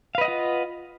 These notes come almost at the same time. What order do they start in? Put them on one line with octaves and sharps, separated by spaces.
F5 B4 D#5 F#5 F4